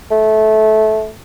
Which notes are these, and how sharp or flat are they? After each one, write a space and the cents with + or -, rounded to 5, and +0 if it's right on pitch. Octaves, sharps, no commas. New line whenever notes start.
A3 -20